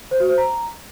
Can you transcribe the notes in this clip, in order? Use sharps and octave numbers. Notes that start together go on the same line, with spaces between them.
C5
F#4
C5
A#5